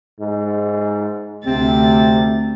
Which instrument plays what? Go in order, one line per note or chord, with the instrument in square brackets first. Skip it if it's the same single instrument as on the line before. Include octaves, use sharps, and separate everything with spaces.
[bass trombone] G#2
[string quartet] D2 A6 [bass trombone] C3 [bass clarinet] C4